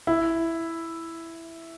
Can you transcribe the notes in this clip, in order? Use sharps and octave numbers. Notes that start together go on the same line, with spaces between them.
E4